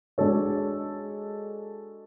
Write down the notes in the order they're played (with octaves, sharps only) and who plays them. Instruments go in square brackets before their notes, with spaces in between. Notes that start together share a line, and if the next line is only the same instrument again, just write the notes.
[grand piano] G#3 D4 F#4 A4 C#5